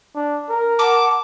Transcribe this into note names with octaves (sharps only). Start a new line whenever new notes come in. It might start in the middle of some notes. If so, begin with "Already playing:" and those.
D4
A#4
F#5 A5 D6